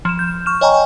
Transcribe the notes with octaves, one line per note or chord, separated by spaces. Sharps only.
F3 E7
G6
C#6 F6 E7
C#5 D#5 G5 G#5 A#5 C#6